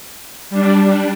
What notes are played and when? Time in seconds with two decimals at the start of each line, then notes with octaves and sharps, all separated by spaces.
0.50 G3 D4